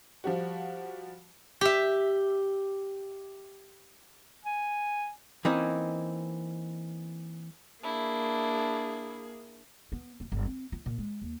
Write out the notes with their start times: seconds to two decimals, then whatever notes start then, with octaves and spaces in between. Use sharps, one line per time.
0.24 F3 G3 F#4
1.61 G4 E5
4.45 G#5
5.45 E3 A#3 C4 C#4 D#4
7.83 A#3 D4 E4 G#4
9.92 B3
10.20 D1
10.32 G1
10.46 C4
10.72 F4
10.86 A#2
10.98 G#3
11.22 D#2